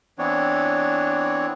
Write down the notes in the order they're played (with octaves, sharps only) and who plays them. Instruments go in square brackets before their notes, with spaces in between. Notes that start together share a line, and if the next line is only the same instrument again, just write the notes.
[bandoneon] E3 B3 C4 D4 C#5